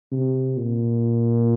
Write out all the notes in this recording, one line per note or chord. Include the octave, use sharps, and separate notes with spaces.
C3
A#2